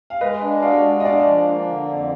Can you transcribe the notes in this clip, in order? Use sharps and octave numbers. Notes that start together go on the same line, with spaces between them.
F5
G#3 B4 D#5
D4
F#4 D5 F5
G#3
D#5
D4 D5 F5
F3
A#3
D3
F2